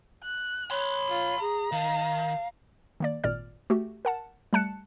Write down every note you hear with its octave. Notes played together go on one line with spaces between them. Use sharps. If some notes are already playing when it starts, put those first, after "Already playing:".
F#6
C#5 B5 C6
F4
G#4 A#5
D#3 F5
D#3 A#3 D5
G#1 A#2 D5 F6
A3 F#4 G4
A#4 F#5 A5
G3 A3 A5 F#6 C#7